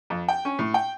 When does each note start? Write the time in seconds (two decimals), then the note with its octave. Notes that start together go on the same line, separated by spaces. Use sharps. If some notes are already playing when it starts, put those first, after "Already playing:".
0.10 F2
0.28 G5
0.45 C#4
0.59 A2
0.74 G5